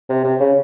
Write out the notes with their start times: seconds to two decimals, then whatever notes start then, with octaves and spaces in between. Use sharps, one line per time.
0.09 C3
0.24 C3
0.40 C#3